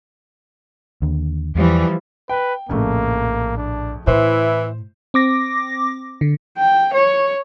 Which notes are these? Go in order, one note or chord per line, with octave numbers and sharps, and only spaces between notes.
D#2 D3
E2 E3 F3 G3
B4 G5
A#1 F2 A2 C#3 A3 A#3
D4
A2 E3 E4 C5
C4 D6 A#6
D3
G5
C#5